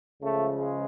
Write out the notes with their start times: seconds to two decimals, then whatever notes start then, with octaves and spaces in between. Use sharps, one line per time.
0.22 C#2 C#3 F3 A3
0.56 G#3